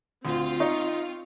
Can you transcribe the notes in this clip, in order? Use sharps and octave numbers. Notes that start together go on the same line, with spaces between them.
D2 C4 F4 F5
D#4 C#6